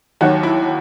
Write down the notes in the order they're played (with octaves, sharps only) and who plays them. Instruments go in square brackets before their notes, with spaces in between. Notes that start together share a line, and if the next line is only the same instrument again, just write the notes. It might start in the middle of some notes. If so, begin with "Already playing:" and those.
[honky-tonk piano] D#2 D#3 F#3 F#4
E4